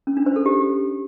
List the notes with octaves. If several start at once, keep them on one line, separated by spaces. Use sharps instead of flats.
C#4
D4
C5
A4
G4